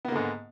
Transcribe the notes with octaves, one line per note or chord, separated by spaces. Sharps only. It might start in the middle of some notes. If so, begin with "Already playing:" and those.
G#2 D3 A#3 B3